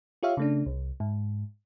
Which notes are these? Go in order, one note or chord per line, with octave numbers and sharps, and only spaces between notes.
F4 G4 C#5 E5 F5
C#3 A3 D4
C2
G#2